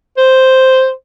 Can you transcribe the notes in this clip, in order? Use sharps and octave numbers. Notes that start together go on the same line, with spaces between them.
C5